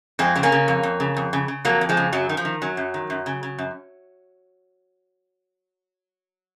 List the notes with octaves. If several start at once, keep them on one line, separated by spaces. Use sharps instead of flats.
F2 G#3 C4
C#3 C4
A#3 C#4
C#3
F2
F2
C#3
F2
C#3
C#3
F2 F#3 A#3
F2
F3 G#3
C#3
F#2 F#3
D#3
F3
D#3
F#2 F#3
F#2
D#3
F#2
C#3
C#3
F#2